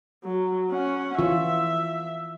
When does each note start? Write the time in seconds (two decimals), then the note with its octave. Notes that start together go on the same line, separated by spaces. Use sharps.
0.24 F#3
0.71 C#4 F#5
1.19 E3 F4 E5